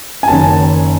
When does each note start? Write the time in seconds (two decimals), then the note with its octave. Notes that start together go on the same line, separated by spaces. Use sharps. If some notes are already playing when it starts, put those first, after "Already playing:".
0.23 G#5
0.28 F#1 F#2 D#3 A5